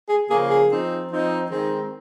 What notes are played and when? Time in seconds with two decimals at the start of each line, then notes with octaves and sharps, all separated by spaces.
0.09 G#4
0.28 C#3 F3 A#3 G#4
0.49 G#4
0.69 F3 C4 D#4
1.10 F3 C4 D#4
1.50 D#3 G#3 C4 D#4